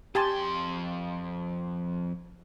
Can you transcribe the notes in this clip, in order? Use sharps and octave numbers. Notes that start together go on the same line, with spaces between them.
F2 G4 G#5 A5 C6